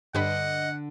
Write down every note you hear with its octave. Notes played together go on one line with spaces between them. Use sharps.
G2 D3 B4 D#5 F#5